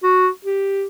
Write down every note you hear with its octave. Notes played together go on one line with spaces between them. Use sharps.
F#4
G4